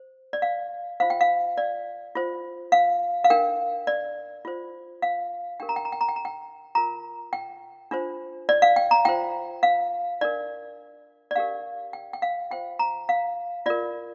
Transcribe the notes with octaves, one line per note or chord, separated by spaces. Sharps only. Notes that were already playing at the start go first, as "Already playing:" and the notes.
Already playing: C5
D5
F5
F4 C5 F5
G5
F5
D5
F4 C5
F5
F5
D4 A#4 G5
D5
F4 C5
F5
D4 G4 A#4 G5
A#5
G5
A#5
G5
A#5
G5
A#5
G5
F4 A#4 A#5
G5
D4 F4 C5
D5
F5
G5
A#5
F4 C5 G5
F5
D4 A#4 D5
D5
D4 G4 A#4 F5
G5
G5
F5
F4 C5 G5
A#5
F5
F4 A#4 D5